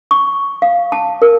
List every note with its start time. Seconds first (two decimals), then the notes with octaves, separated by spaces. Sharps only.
0.11 C#6
0.62 F5
0.92 A5
1.22 A#4